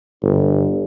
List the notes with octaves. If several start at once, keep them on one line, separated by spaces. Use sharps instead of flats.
G1